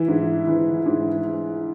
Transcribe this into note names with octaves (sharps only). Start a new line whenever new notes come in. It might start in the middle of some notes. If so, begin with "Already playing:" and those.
Already playing: E3 E4
G#2
E3
G#2